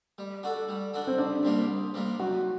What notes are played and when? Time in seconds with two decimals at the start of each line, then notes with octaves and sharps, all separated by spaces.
0.18 G3
0.43 D4 F#4 A4
0.69 G3
0.94 D4 F#4 A4
1.07 C4
1.18 C2 D4
1.43 C3 G3 A#3 D4
1.68 C2
1.94 C3 G3 A#3 D4
2.20 F#2 F#4